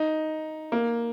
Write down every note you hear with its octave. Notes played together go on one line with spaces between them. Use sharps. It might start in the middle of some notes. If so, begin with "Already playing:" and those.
Already playing: D#4
A#3